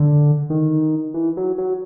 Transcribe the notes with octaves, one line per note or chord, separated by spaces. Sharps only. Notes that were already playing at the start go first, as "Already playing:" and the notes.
Already playing: D3
D#3
E3
F#3
F#3